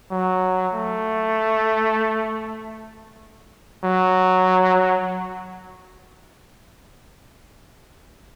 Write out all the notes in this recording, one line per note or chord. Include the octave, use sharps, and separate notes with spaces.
F#3
A3
F#3